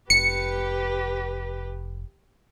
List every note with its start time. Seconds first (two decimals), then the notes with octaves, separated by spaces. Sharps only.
0.10 F1 G4 B4 C#7